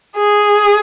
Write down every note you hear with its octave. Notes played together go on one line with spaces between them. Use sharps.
G#4